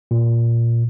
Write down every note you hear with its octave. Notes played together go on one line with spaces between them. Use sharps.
A#2